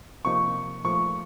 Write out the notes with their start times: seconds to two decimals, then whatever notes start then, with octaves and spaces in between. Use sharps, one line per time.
0.25 C3 F3 A#3 D#4 C#6
0.84 A#2 F3 A3 C#6